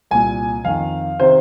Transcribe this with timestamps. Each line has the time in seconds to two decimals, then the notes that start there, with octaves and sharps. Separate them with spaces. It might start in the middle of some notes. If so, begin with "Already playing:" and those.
0.11 C2 A#2 G#5
0.65 F2 D#3 F5
1.20 C3 D#3 C5